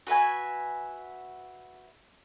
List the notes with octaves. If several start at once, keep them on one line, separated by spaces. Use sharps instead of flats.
F#4 B4 E5 G#5